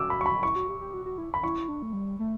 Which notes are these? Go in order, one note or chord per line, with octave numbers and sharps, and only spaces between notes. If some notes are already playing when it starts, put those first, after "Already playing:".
Already playing: F#4 D6 E6
B5
C#6
B5
E4 C#6
F#4
G4
G4
F#4
F#4
E4
B5
E4 C#6
D4
A3
G3
A3